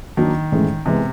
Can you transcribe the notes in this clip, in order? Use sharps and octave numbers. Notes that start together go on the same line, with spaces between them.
D#3 F#3 A#3 D4
A2 E3 G#3 C#4 E4
C3 E3 G#3 B3